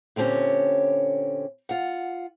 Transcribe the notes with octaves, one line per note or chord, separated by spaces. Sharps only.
A#2 D3 C4 C#4 G4
F4 F#5